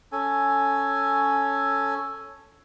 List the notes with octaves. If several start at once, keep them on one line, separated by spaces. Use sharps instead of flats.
C#4 A4 G#5